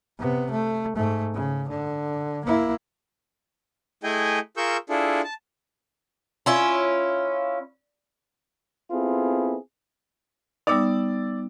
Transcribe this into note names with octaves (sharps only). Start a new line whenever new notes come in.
C3 B3
A3
G#2 A3
C#3
D3
A#3 E4
A3 E4 G#4 D#5 G5 G#5
F4 G#4 A#4 C#6 E6 G6
D4 E4 F4 G#4 A4
A5
C#4 E4 F4
B3 C4 E4 F4 G#4 A4
G3 B3 D#4 D5 D6 E6